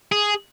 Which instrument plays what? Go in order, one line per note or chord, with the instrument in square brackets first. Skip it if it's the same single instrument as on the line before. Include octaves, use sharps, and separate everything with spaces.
[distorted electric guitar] G#4